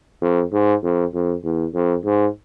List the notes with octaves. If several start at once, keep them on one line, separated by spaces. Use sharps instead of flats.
F2
G#2
F2
F2
E2
F2
G#2